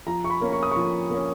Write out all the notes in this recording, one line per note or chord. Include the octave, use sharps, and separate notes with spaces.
F3 A#5
C#6
B5
A#3 C#4
C#6
D#6
F3 C#6
A#3 C#4